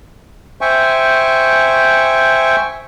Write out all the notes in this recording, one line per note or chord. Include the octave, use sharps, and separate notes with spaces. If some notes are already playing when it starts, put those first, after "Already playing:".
C5 E5 G5 G#5 C#6